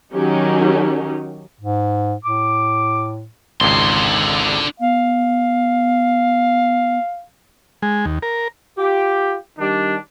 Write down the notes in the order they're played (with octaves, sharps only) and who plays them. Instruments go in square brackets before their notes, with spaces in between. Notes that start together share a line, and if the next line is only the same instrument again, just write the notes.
[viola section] D#3 F#3 C#4 D#4 G4
[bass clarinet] G#2
[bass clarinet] A2 [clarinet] D6
[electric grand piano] G#1 C#2 [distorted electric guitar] D3 C6
[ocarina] B3 [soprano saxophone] F5
[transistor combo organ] G#3
D#2
A#4
[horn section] F4 G4
D#3 G3 D4